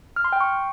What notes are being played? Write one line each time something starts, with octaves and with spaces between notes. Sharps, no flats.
F6
C6
G5
C#6